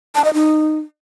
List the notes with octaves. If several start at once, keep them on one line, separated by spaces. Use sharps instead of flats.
A5
D#5
D#4